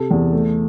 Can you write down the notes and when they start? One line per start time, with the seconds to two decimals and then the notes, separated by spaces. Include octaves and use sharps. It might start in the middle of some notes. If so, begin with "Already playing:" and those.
Already playing: C3 A4
0.11 E2
0.33 A3